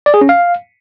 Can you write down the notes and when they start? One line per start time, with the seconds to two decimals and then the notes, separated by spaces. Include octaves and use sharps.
0.06 D5
0.14 G#4
0.21 C#4
0.29 F5